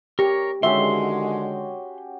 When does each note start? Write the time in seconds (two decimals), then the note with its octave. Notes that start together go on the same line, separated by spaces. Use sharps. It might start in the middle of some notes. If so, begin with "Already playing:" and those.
0.19 G4 A#4 C#5
0.63 D3 D#3 G#3 C#4 F#4 G4 E5 C6